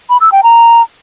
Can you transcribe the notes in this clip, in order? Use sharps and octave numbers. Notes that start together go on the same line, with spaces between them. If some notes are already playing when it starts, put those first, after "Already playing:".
B5
E6
G5
A#5